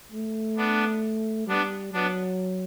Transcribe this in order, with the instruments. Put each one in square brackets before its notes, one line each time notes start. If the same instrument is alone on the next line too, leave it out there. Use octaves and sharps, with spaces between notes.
[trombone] A3
[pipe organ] B3 D4
[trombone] G3 [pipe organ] B3 D4
[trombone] F#3 [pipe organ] B3 D4